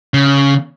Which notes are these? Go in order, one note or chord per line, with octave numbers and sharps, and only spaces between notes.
C#3